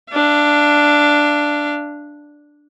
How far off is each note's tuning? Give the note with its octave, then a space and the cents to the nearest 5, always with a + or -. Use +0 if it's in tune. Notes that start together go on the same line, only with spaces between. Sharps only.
D4 +0 F5 -40